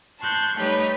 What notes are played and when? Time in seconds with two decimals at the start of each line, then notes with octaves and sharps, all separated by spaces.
0.22 A5 C6 C#6 F#6 G6
0.58 G3 A3 D#4 G4 B4 C#5